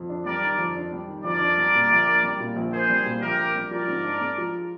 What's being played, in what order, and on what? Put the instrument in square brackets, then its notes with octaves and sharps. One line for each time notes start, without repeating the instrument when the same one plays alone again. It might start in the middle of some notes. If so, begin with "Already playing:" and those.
Already playing: [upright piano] F2
D4
[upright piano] G3 [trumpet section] A#4 D5
[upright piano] D#3
F2
D4
G3
D#3
[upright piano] F2 [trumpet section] A#4 D5
[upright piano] D4
G3
A#2
A#1
A#3
G3
A#2
A#1
[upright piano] A#3 [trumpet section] G#4 C5
[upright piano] G3
A#2
[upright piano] A#1 [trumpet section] G4 A#4
[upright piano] A#3
G3
[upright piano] F3 [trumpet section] A#4 D5
[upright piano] G#2
D4
G#3
F3